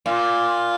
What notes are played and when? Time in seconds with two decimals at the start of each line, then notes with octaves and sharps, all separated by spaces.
0.06 A#2 F4